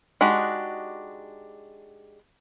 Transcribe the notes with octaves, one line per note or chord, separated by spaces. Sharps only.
G#3 D4 D#4 F#4 G4